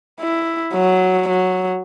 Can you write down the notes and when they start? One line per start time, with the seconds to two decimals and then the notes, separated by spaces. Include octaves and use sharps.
0.20 E4
0.74 F#3
1.29 F#3